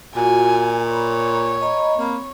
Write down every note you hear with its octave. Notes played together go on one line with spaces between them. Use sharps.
A#2 F4 F#4 G#5
C#5 A#5 B5
D#5 A#5 B5
A#3 C4 B5